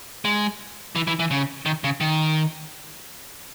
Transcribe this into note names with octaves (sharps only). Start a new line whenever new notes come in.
G#3
E3
E3
E3
C#3
D#3
C#3
D#3